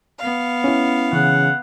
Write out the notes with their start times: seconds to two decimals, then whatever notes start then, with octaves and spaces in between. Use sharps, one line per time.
0.19 B3 F5
0.64 C#4 E4
1.13 C#3 E3 F#5